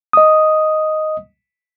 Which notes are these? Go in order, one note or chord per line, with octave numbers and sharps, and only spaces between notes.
D#5 D#6